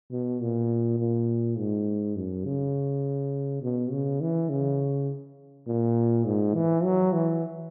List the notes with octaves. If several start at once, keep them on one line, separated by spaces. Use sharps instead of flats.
B2
A#2
A#2
G#2
F#2
C#3
B2
C#3
E3
C#3
A#2
G#2
E3
F#3
E3